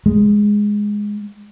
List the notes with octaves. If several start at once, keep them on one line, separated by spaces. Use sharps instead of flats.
G#3